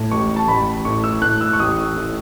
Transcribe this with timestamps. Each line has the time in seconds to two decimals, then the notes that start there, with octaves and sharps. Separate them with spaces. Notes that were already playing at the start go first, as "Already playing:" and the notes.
Already playing: A2
0.11 A1 C#6
0.36 A5
0.48 A1 B5
0.85 A2 C#6
1.04 E6
1.22 A2 F#6
1.41 E6
1.53 C#6
1.59 A1 D#6
1.96 A2